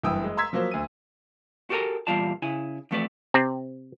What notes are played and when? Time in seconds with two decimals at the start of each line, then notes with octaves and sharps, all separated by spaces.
0.04 F#1 G2 E3 G5 D#6 E6
0.24 G#3
0.37 A#5 C6 E6 G#6 B6
0.53 F3 F#3 A#3 C5
0.71 D2 D#7
1.70 F#4 G4 A4 A#4 G#5 A#5
2.07 E2 A#2 G3 F4 D5 A5
2.42 C#3 E4 G#5
2.91 F2 E3 A3 F#4 B4 D5
3.34 C3 C4